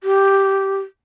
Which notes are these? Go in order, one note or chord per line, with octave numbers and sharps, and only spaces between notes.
G4